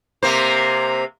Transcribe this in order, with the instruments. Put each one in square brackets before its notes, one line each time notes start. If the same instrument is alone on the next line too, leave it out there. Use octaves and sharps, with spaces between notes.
[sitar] C3 A#3 C5